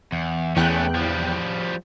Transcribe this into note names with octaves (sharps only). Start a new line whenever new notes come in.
E2
E2 A3 C#4 G5 F#6
F3 G3